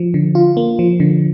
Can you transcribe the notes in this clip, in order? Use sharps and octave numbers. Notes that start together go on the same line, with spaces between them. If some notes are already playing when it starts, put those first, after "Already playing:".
Already playing: F3
D3
F4
A#3
F3
D3